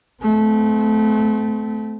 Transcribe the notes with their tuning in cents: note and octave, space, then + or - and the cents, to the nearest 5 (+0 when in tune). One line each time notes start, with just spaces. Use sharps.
A3 -25 C4 -35